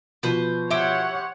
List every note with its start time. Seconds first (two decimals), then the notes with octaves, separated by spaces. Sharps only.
0.23 B2 F3 B4 C5 F#6
0.71 E4 G4 C5 C#5 E5 F#5